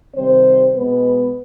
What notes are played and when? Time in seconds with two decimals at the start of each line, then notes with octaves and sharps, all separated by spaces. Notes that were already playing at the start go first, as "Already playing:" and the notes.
0.15 C3 D#3 G3 C4 C5
0.75 B2 G#3 B3 B4